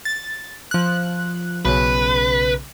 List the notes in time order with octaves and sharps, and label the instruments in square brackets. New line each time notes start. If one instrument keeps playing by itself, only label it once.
[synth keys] A6
F3 F#6
[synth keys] B1 C#3 [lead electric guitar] B4